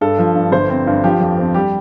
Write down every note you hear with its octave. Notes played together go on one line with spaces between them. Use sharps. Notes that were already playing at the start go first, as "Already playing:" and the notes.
G2 A4
F3
G2
G1 C5
C4
G2
F3 G4
F2
C4
G3 G4